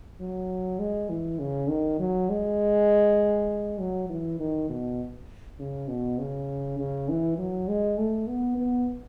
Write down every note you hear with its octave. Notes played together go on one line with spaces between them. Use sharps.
F#3
G#3
E3
C#3
D#3
F#3
G#3
F#3
E3
D#3
B2
C#3
B2
C#3
C#3
E3
F#3
G#3
A3
B3
B3